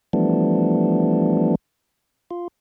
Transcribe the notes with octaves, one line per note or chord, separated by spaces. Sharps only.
E3 F3 G3 A3 B3 D4
F4